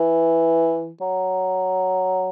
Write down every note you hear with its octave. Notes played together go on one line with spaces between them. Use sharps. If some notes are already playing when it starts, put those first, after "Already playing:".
Already playing: E3
F#3